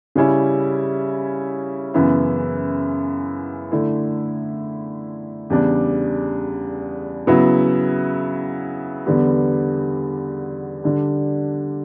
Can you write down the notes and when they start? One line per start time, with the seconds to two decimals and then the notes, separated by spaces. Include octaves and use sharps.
0.15 C#3 G3 C#4 E4
1.94 F#2 C#3 E3 B3 E4
3.71 D3 A3 E4
5.50 E2 C#3 G3 D4
7.27 C#3 F#3 B3 E4
9.06 E2 D3 G3 B3
10.84 D3 G3 D4